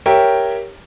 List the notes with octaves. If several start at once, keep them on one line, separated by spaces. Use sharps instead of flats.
G4 A#4 C#5 E5 G5